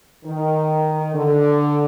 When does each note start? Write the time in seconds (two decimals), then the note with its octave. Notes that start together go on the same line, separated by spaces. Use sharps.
0.25 D#3
1.14 D3